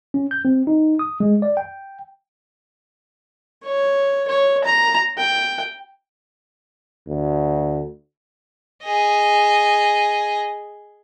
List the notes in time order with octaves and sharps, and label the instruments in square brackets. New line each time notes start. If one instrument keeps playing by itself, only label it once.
[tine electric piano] C#4
G6
C4
D#4
D#6
G#3
D5
G5
[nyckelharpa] C#5
C#5
A#5
G5
[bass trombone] D2
[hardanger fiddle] G#4 D#5